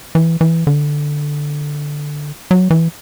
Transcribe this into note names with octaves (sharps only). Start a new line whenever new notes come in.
E3
E3
D3
F#3
E3